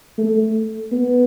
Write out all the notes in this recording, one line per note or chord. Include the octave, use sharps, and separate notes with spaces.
A3
B3